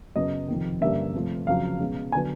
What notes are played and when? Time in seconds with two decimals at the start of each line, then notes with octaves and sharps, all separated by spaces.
0.16 F#2 C#3 F#3 B3 D#5
0.48 F2 C3 D#3
0.81 G2 D3 G3 A#3 C#4 E5
1.14 C3 F3 A3
1.47 F2 C#3 F#3 F5
1.80 B2 G#3 C#4
2.12 D3 F#3 B3 G#5